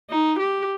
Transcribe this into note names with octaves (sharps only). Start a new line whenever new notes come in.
D#4
G4